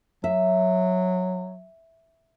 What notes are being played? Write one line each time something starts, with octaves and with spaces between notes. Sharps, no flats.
F#3 E5